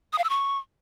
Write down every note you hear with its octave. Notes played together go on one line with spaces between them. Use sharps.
D#6
F5
E6
C#6